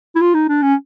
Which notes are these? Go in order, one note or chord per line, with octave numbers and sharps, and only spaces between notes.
E4
F4
D#4
D4
C#4